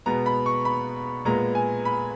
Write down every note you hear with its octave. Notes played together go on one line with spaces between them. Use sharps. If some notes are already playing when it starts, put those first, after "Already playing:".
B2 G#3 B3 A#5
B5
C#6
B5
A#2 G#3 B3 A#5
G#5
B5